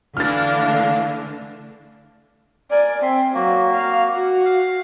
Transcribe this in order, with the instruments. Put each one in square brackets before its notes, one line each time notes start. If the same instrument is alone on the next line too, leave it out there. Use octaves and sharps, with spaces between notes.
[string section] D3 A3 [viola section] E3 D4 [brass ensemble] F5 [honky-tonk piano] F6 A6
[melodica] A#4 G#5 [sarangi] D5
[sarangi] C4 [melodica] E5 C6
[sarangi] F#3 [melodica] A#3 F#4
[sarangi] F5
F#4
[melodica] F5